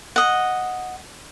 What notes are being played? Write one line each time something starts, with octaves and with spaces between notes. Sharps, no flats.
D#5 F#5